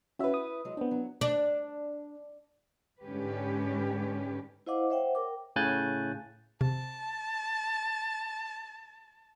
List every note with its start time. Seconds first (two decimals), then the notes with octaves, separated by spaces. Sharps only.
0.19 C#4 E4 F#4 B4 E5
0.33 E5 D#6
0.65 F#3 G#3
0.77 B3 C4 D4
0.91 F#3
1.21 D4
3.02 G#2 D3 G#3 C#4 G4 B4
4.67 E4 C5 D#5 F5 F#5 D6
4.90 C5 C#5 E5 F#5 G5
5.15 A#4 G5 D6
5.56 A2 C#3 G#5 F#6 G6 A6
6.61 C3 A5